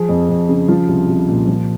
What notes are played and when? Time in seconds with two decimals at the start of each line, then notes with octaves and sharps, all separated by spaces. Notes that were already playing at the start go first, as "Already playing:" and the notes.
Already playing: F3 G#4
0.09 F2
0.29 F2
0.49 C#3
0.68 F3 F4
0.88 C2
1.09 C2
1.28 A#2
1.48 F3